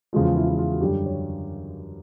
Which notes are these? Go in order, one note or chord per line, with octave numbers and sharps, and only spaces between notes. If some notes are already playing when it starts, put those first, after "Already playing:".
E2 C#3 F3 G#3 F4
F4
E4
E4
F4
F#4
F#2 D3 G3 G4
C#5